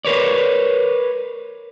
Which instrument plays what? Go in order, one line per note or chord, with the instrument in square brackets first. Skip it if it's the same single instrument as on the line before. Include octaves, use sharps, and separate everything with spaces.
[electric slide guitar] A#4 B4 C#5 D5